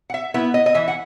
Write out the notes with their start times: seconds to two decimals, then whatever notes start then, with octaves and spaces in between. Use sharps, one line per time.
0.10 F#5
0.14 E5
0.34 B3 E4 E5
0.54 D#5
0.66 D#5
0.75 E3 E5
0.88 F#5